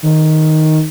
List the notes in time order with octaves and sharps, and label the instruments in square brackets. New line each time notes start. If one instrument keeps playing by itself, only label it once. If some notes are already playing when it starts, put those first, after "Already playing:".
[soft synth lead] D#3